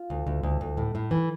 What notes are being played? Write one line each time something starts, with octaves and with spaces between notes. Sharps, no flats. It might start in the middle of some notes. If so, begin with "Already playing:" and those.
Already playing: F4
D2
D2
D2
D2
A2
A2
E3